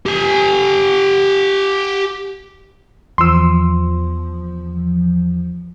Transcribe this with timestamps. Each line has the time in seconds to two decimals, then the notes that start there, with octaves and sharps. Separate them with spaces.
0.06 G4 G#5
3.18 E2 F3 C6 E6